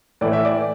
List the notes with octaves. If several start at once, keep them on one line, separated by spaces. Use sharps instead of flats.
A2 E3 A3 D5
E5
D5